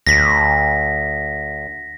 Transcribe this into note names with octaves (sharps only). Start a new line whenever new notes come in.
D2 A#6 B6